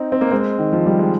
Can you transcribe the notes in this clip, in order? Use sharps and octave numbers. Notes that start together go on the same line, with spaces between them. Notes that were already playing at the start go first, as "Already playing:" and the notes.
Already playing: C4 D#4
C4
A#3
G#3 C4
D#3
F3
G3
G#3